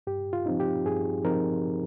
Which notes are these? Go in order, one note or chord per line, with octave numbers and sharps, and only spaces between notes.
G2 G4
F4
F3 C4 D#4
G4
G2 G#4
F3 C4 D#4 A#4